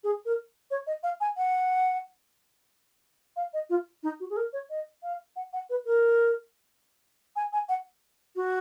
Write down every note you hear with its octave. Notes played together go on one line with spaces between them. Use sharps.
G#4
A#4
C#5
D#5
F5
G#5
F#5
F5
D#5
F4
D#4
F#4
G#4
A#4
C#5
D#5
F5
F#5
F#5
B4
A#4
G#5
G#5
F#5
F#4